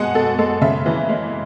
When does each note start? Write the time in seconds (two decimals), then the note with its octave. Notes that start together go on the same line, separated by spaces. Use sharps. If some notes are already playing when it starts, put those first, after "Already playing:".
Already playing: B2 G#3 F#5 G#5
0.15 B2 A4
0.39 G#3 A4
0.61 C#3 E5
0.86 E3
1.09 G#3